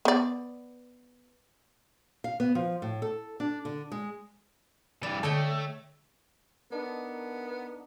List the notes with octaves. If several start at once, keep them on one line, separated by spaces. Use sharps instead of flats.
B3 D5
F5
B3
F3
A2
A4
D4
D3
G#3
G2 E3 D5
D3 A3 C#5 D#5 G5
B3 D4 D#4 A4 A#4
F5